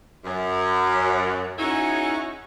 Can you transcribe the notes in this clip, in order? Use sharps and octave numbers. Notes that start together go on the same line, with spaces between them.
F#2
C#4 D#4 E4 F#4 G#4 C#5